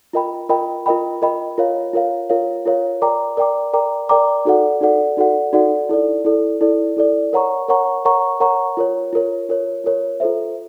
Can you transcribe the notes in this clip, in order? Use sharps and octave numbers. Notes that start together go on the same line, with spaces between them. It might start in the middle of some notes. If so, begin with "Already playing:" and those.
F4 A#4 D#5 G5 B5
F4 A#4 D#5 G5 B5
F4 A#4 D#5 G5 B5
F4 A#4 D#5 G5 B5
F4 A#4 C#5 F5
F4 A#4 C#5 F5
F4 A#4 C#5 F5
F4 A#4 C#5 F5
A#4 D5 G5 A#5 D6
A#4 D5 G5 A#5 D6
A#4 D5 G5 A#5 D6
A#4 D5 G5 A#5 D6
D#4 F#4 A4 D5 F#5
D#4 F#4 A4 D5 F#5
D#4 F#4 A4 D5 F#5
D#4 F#4 A4 D5 F#5
E4 A4 D5
E4 A4 D5
E4 A4 D5
E4 A4 D5
A#4 C#5 F#5 A#5 C#6
A#4 C#5 F#5 A#5 C#6
A#4 C#5 F#5 A#5 C#6
A#4 C#5 F#5 A#5 C#6
F4 A#4 C#5
F4 A#4 C#5
F4 A#4 C#5
F4 A#4 C#5
F4 A4 C5 E5